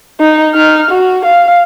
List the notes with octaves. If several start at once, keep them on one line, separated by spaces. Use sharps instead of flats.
D#4
D#4 F6
F#4
F5